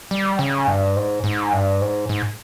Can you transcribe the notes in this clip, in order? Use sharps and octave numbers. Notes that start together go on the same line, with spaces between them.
G3
C#3
G2
G#2
G#2
G2
G#2
G#2